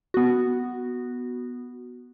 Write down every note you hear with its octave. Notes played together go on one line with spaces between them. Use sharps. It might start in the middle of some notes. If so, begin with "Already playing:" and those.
B3 F#4